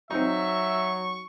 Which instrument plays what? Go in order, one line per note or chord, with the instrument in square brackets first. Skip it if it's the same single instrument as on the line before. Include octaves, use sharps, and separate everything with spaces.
[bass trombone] F#3 [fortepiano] C4 D#4 [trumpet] E5 [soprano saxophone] C#6